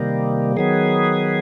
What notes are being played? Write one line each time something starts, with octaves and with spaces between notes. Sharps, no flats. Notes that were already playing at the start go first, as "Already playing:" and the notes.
Already playing: C3 D#3 G3 A#3
D#3 F#3 B3 G#4